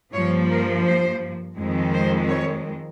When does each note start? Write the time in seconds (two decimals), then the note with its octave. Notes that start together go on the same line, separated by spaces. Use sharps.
0.14 G2 F3 A#3 C#5
0.50 A#4
0.85 C5
1.57 F2 D#3 G#3
1.93 C5
2.28 C#5